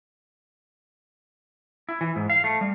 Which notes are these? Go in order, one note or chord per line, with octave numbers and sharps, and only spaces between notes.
E4
E3
G#2
F5
A3
G3